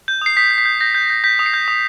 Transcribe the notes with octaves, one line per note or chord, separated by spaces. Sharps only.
G6
D#6 C7
D#6 B6
G6
B6
G6
G6 A#6
G6
G6
G6 B6
D#6
C7
G6
D#6